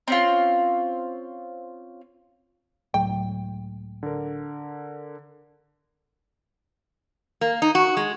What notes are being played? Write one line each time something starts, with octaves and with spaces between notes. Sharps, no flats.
C4 C#4 F4
C#2 A2 F#3 G5
D3 A#4
A#3
D#4
F#4
G#3